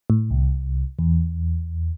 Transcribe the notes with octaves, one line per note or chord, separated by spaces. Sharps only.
A2
C2
E2